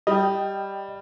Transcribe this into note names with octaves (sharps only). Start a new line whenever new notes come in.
G3 D#5 G5